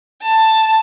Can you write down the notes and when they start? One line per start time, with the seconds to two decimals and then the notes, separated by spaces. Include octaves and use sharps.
0.22 A5